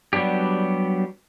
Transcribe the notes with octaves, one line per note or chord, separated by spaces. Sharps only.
F#3 G3 B3 D4 G4